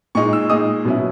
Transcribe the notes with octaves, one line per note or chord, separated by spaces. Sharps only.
A#2 G#3 D#4 C#6
E6
A#2 G#3 D#4 D#6
B2 F#3 C#4 E4